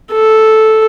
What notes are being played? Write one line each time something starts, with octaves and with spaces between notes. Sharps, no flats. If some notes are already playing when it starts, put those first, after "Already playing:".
A4